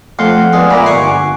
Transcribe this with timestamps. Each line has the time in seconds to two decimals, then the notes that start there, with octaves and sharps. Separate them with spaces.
0.19 F2 A3 F5 F#5 C6
0.53 G#3 B3 D4 A4 D5
0.70 A#2 F4 E5 G#5 A#5 B5 D6
0.86 G1 F#5 C#6 C7